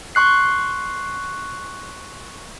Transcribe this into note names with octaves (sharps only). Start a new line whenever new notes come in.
C6 C#6 F#6 C7